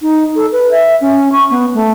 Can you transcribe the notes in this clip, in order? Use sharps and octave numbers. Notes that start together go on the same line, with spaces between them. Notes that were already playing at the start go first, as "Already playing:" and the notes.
D#4
A4
B4
E5
C#4
C#6
B3
A3